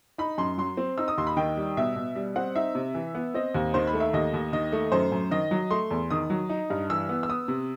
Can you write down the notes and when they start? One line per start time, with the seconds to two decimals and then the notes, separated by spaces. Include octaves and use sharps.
0.18 D#4 B5
0.38 F#2 C6
0.58 F#3 C6
0.77 C4
0.98 D#4 E6
1.08 D#6
1.18 D#2 C6
1.27 B5
1.37 D#3 G5
1.57 G3
1.77 B2 E5
1.96 B2
2.15 G3
2.36 C4 F#5
2.55 D#4 E5
2.75 C3
2.94 E3
3.15 B3
3.34 C4 D#5
3.54 D#2
3.74 D#3 C5
3.87 B5
3.93 A3
4.00 E5
4.13 D#2 D#5
4.34 D#2
4.53 D#3 D#5
4.72 A3
4.92 F#2 C5
5.12 F#2
5.31 D#3 D#5
5.51 F#3
5.71 A3 C6
5.91 E2
6.10 D#3 D#6
6.30 F#3
6.49 D#4
6.70 G2
6.89 E3 E6
7.09 B3
7.23 E6
7.29 B3 D#6
7.48 C3